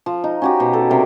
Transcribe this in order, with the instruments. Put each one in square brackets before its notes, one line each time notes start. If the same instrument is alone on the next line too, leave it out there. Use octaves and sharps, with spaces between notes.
[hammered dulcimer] F3
D#4
C#4 F#4 G4
B2
A4
C3 A#4 D5